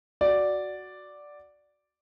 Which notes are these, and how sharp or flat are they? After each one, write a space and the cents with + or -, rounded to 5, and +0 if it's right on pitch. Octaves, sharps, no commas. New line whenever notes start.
F#4 +0 D5 +0